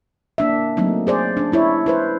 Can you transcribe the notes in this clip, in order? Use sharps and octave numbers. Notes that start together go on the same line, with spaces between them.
A#3 D4 E5
F#3 A3 A#3 C4 D#4
G#4 C5 D5
C#4 D4
D4 E4 C#5
E4 B4 C5